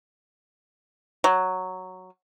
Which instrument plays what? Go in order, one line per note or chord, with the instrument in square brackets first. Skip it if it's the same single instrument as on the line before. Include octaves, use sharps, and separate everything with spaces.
[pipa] F#3